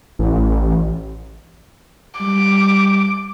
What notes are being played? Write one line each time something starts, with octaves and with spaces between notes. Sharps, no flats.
A1
G3 D6